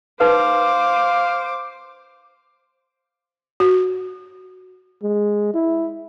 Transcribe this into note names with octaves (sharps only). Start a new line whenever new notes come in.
D#4 B4 C5 F5 D6
F#4
G#3
E4